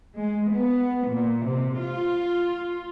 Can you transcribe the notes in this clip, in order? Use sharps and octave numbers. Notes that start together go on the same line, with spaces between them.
G#3
B3
A#2
C3
F4